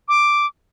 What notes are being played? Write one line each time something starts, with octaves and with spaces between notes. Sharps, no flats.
D6